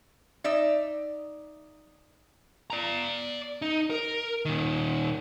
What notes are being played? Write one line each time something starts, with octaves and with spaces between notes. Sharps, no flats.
D#4 D5 E5
D5 A#5
D#4
A#4
A#2 D#3